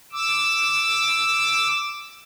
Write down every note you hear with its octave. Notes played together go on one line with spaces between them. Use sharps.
D6 E6